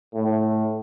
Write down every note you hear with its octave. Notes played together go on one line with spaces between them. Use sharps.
A2